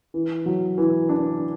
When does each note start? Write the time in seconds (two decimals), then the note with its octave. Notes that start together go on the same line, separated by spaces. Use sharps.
0.14 E3
0.46 F#3
0.78 E3
1.09 D4